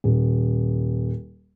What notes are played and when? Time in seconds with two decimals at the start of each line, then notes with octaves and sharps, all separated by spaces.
0.04 D#1